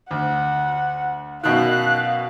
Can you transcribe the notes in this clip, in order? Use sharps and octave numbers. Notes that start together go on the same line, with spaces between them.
D2 F#5
F#2 B2 D#3 F5 F#6